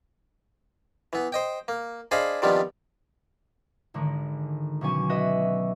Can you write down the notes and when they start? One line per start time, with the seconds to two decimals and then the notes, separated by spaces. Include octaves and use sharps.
1.13 E3 B3
1.32 C5 D#5 G5
1.68 A#3
2.11 D4 G#4 C5 D#5 F5 B5
2.42 C3 D#3 F3 G3 B3 D4
3.94 G#1 D3 D#3 G#3
4.81 B1 B2 F#3 C#4 G#5 C#6
5.09 F#4 B4 D#5 E5 D#6